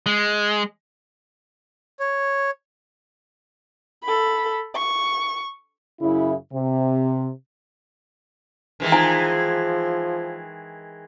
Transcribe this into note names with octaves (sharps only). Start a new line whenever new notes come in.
G#3
C#5
A4 B5
C#6
F#2 C#3 E4
C3
D#3 E3 G#3
F3 D#4 G#5 A#5